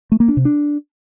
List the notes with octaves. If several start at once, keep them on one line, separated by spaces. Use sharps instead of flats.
A3
A#3
D4
C3
D4